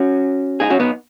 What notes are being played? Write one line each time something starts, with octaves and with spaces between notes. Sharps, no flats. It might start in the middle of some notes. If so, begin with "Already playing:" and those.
Already playing: C#4 F#4
D#4 G#4
C#4 F#4
B3 D#4